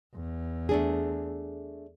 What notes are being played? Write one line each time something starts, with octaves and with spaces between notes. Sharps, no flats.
E2
A3 D4 G#4